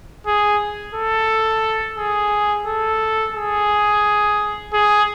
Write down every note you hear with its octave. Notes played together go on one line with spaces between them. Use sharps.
G#4
A4
G#4
A4
G#4
G#4